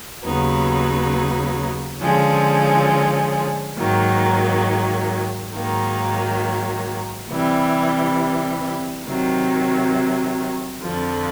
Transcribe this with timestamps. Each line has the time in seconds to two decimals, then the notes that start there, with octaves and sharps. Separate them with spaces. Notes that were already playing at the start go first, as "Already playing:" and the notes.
0.24 D#2 C#3 F#3 B3 D#4
2.01 D3 F3 G#3 C#4
3.77 G#2 D#3 F#3 A#3
5.53 G#2 D#3 F#3 A#3
7.29 C3 E3 G3
9.06 C3 D#3 F#3
10.82 F2 D3 F3